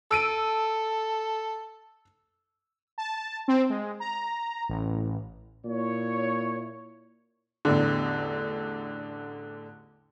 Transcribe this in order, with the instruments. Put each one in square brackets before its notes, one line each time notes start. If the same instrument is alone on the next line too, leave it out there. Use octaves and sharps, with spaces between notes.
[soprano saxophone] A4 [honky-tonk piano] E6 D7 D#7
[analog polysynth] A5
C4
G#3
A#5
A1
[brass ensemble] A#2 E4 C#5
[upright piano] A1 E2 D3